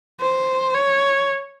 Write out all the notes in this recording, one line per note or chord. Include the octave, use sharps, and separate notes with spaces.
C5
C#5